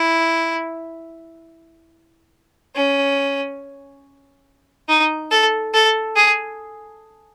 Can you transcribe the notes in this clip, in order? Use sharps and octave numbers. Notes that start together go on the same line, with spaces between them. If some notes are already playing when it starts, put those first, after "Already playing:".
Already playing: E4
C#4
D#4
A4
A4
G#4